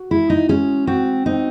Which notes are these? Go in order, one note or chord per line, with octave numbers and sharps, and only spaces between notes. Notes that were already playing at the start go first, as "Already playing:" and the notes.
Already playing: F#4
G#3 E4
D#4
G#3 C#4
C4 F#4
C4 D#4